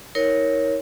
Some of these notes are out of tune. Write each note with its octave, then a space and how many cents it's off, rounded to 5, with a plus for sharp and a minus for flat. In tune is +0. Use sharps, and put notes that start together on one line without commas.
D#4 +45 A#4 +0 C#5 +0